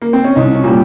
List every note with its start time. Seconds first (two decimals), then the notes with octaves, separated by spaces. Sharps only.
0.02 A#3
0.13 C4
0.24 C#4
0.36 C2 D#4
0.54 C#4
0.64 A#2 G3